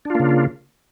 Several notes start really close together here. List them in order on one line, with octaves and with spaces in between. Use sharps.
D4 F4 A#3 C#3